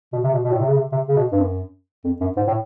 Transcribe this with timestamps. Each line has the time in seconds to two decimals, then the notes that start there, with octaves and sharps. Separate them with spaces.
0.13 B2
0.23 C3
0.33 B2
0.44 B2
0.52 A2
0.60 C3
0.68 C#3
0.76 C3
0.92 C3
1.08 C#3
1.16 B2
1.32 G2
1.40 F#2
2.04 F2
2.20 F#2
2.37 G#2
2.47 A2